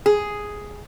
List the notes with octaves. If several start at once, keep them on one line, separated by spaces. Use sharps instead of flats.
G#4